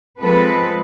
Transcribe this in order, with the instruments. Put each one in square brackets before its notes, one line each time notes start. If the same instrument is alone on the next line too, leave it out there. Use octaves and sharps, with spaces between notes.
[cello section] F3 G#3 C4 A4 B4